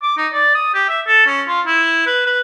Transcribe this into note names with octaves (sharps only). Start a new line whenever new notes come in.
D6
D#4
D5
D#6
G4
E5
A4
C#4
F4
E4
B4
B4